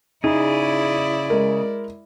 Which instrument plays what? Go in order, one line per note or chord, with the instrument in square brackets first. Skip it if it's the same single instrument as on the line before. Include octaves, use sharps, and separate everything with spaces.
[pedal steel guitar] C#3 G#4 [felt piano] D#4 [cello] E4 D5
[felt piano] G#3 A#4